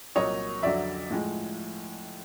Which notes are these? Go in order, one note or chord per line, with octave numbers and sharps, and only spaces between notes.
C2 A#2 F#3 C#5 D#5
F2 D3 F#3 D5 E5
A2 F3 G#3